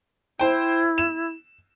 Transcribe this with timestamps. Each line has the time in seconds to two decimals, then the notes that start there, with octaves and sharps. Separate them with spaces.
0.40 E4 C5 G5
0.98 E7